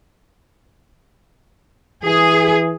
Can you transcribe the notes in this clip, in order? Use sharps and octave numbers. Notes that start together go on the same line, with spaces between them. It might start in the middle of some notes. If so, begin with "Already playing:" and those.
E3 G#4